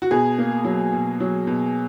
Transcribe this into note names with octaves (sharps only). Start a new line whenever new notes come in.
F#4
B2 G#4
A#3
F#3
B2
F#3
B2